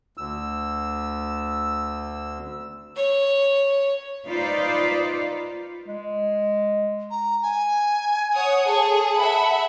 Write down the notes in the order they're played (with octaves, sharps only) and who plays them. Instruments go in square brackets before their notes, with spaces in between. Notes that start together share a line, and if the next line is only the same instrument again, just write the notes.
[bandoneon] D2 E6
[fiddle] C#5
[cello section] D#4 F4 B4 C5 D5
[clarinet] G#3
[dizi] A#5
G#5
[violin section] C#5 F#5 D#6
[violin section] G#4 A4 [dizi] A5
[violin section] E5 F#5 B5